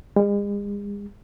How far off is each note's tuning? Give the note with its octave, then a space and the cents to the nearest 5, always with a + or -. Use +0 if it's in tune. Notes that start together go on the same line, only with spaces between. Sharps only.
G#3 -40